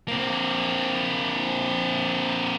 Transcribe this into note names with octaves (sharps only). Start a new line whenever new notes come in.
A#3 C4